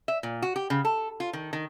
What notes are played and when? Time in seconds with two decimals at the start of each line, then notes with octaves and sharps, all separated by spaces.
0.08 E5
0.23 A#2
0.42 F#4
0.56 G4
0.70 C#3
0.85 A4
1.20 F4
1.33 D#3
1.53 D#3